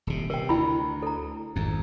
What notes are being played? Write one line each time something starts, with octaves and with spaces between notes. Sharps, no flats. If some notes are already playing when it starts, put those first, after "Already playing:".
D#1 C3
C3 A#4 G5
D2 E4 B5
A4 A#5
G#1 F2